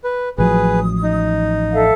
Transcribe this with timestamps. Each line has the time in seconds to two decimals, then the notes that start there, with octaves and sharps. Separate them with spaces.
0.04 B4
0.38 A1 F3 F#3 G#4 B4 D#6
1.03 D#4
1.73 A4 E5 F5